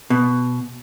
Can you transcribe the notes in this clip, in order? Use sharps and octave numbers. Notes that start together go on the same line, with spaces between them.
B2